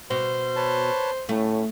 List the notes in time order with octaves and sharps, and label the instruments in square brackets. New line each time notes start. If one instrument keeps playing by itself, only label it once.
[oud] B2 [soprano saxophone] C5
[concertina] B4 C#5 A5
[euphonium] A2 [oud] A3 [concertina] C#4